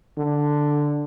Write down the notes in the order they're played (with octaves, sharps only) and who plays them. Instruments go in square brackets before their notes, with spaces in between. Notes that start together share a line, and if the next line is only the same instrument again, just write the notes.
[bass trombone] D3